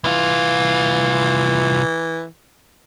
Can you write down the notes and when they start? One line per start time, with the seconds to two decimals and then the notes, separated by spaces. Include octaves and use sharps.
0.04 C2 E3 F4